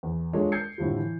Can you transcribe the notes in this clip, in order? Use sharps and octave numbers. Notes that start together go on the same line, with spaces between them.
E2
G#3 D4 F4 A4 C#5
G6 G#6 C7 C#7
A2 D3 F3 G3
E3